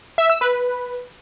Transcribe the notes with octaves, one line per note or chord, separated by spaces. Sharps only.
E5
E6
B4